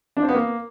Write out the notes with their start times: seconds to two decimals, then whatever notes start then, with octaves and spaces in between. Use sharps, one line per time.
0.17 D4
0.23 C4
0.29 B3
0.35 A#3